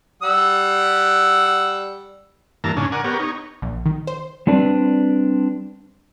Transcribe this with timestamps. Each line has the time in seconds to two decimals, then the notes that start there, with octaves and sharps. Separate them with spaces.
0.22 G3 F#5 E6
2.64 G2 E3 A#3 A5 A#5
2.77 G#2 C#3 C#4 D4
2.92 A#4 D5 F#5 G#5
3.04 B3 G4 A#4 C#5
3.19 D#4 C#5
3.62 A#1
3.86 D#3
4.07 C5
4.47 G3 C4 D4 B4 D5